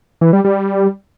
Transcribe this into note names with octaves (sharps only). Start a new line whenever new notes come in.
E3
G3
G3